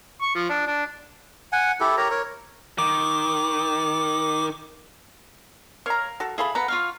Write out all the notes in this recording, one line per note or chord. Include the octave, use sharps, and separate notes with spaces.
C#6
F3
D4
D4
F#5 G#5
E4 G4 A4
G4 A#4 C#5 A#5
A#4 C#5
D#3 D6
A#4 C#5 F5 A#5
F#4 A4
E4 G#4 A4 F5 B5
A4 B4 F#5 A#5
F4 C#5 F5